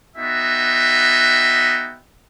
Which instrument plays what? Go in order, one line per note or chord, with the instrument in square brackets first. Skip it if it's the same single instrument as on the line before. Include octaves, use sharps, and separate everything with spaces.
[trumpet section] B3 D#4 F#4 E5 G5